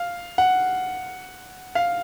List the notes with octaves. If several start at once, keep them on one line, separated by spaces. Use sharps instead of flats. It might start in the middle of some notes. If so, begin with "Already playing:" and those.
Already playing: F5
F#5
F5